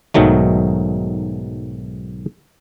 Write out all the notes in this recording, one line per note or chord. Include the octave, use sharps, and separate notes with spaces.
B1 G#2 D#3 F#3 A3